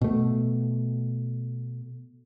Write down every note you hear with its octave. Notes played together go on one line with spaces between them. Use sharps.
B2 A3